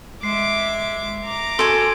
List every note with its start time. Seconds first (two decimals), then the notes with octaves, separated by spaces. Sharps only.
0.23 G#3 E5 D6 C7
1.24 A#5 D6
1.59 F#4 A4 G#5 C6 D7